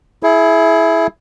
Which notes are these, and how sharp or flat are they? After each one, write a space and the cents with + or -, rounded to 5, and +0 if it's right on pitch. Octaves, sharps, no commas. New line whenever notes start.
E4 +0 G#4 +30